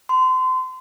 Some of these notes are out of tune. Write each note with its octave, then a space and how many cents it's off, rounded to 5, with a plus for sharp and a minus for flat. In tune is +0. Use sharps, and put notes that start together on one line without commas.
C6 -30